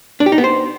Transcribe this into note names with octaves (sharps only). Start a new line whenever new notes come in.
D4
G4
D#4
B3
C5